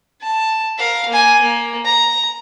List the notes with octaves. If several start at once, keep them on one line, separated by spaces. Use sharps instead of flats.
A5
A#4 F5
A#3 G#5
A#3
A#5